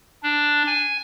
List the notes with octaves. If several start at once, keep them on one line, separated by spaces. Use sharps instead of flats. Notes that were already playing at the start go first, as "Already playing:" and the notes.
D4
G#5